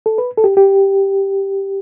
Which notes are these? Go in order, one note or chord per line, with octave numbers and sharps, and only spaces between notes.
A4
B4
A4
G4
G4